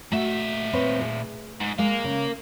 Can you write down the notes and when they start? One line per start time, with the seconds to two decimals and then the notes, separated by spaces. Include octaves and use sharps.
0.12 A#2 A3 F#4 E5
0.73 C4 B4 C#5
1.01 G#4
1.60 G#2
1.79 G#3 A#4 F5
2.04 C#3